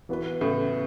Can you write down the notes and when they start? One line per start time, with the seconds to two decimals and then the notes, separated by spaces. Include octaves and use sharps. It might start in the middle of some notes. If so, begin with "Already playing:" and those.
0.09 E3 B3 F#4 B4
0.41 A2 C#3